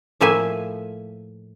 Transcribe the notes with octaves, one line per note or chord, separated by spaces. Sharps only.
A2 F3 A3 A#3 E5 G#5